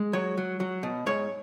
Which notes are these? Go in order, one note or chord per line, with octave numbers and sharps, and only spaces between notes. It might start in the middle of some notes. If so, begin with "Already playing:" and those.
Already playing: G#3
F#3 C#5
F#3
F#3
B2
G#2 C#5